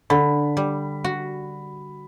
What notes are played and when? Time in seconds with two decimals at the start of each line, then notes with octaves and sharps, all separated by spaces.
0.10 D3 B5
0.57 G3
1.04 F#4